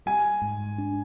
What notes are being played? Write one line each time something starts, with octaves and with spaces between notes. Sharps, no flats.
G3 G#5
G#2
D4